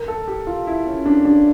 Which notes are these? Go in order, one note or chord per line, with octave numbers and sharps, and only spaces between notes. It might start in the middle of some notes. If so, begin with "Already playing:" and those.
Already playing: A#4
A4
G4
F4
E4
C#4
D4
D4